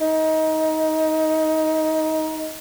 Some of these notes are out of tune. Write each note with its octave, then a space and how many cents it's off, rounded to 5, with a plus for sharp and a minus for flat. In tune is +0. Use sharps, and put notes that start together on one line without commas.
D#4 +20